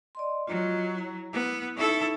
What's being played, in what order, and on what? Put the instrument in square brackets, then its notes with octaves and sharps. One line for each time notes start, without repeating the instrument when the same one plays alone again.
[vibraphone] D5 D#5 C6
[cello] F#3 [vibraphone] F4 D#5 A#5
[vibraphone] E4 A#5
[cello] B3 [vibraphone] E4
[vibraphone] C#4 D#4 [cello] E4 A4